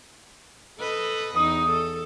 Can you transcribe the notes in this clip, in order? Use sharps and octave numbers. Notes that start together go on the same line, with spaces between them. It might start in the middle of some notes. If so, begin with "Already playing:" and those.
A4 B4 D#5
E2 D#4 D#6
A4